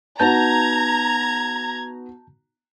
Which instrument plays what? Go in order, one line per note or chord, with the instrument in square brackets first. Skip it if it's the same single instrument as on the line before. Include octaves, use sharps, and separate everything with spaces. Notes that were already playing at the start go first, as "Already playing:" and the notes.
[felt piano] B3 D#4 F#4 [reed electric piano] A5 G6 [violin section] A#5 [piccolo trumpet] G#6